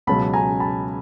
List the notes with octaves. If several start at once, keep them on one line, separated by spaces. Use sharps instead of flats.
C#2 B2 F#3 A5 B5
G#5 A#5
A5 B5